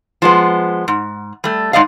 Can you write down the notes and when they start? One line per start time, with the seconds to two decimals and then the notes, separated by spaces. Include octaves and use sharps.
0.22 F3 G#3 B3
0.88 G#2
1.44 G3 A3
1.73 G#2 A#3 D5 D#5 F5